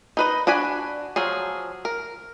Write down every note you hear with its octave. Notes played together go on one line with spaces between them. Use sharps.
D#4 B4 D#5
D4 F#4 G#5 B5
F3 F#3 G#4
A#4